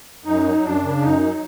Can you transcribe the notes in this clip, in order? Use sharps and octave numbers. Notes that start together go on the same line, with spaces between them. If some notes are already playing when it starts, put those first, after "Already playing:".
F#2 D#4
F#3
F#2 D4
C#3
F#2 D#4
F#3